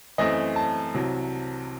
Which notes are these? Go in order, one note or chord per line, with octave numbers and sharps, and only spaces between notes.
F#2 E3 A3 C4 D#5
A5
C2 C3 F#3